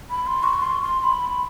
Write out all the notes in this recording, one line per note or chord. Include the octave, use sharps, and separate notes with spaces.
B5
C6
C#6
C6
C6
B5